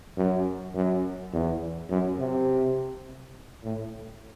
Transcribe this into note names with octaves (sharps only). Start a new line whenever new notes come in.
F#2
F#2
E2
F#2
C3
A2